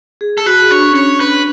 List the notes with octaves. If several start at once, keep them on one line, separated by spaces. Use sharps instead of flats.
G#4
A4
F#4 B4
D4 C#5
C#4
D4 C#5
B4